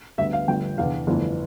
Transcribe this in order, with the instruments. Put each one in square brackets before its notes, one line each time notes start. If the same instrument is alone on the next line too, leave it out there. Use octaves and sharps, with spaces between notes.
[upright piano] D2 D3 G3 B3 E5
F5
G1 G2 F3 A3 G5
F1 E2 D3 F5
G1 F2 E3 A3